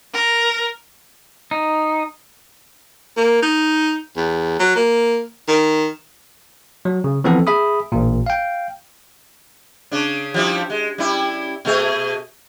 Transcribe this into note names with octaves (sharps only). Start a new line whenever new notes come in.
A#4
D#4
A#3
D#4
E2
F#3
A#3
D#3
F#3
C#3
E3 F3 B3 C4 E4 A4
G#4 E5 B5 D#6
A1 A#2
F5 G5
C#3 D4
F3 G3 E4
G#3
G3 C#4 E4
B2 A3 G#4